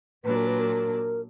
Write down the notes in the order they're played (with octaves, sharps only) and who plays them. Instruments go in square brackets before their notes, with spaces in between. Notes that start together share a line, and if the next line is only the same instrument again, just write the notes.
[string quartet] A#2 F#3 D4 [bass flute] B4
[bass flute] A#4
B4
A#4